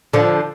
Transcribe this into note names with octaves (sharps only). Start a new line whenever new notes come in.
D3 F3